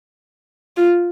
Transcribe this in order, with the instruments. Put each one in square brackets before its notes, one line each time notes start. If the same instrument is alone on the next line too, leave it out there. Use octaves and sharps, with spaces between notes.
[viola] F4